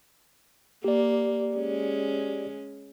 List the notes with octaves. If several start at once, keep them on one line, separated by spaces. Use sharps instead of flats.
A#3 G4 D5
G#3 C#4